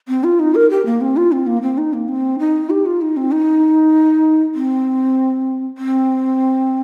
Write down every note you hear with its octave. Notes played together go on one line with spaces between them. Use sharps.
C4
F4
D#4
A#4
G4
A#3
C4
F4
C4
A#3
C4
D#4
A#3
C4
D#4
G4
F4
D#4
C4
D#4
C4
C4